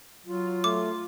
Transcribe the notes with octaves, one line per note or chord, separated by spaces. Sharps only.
F#3 F4
A3 D6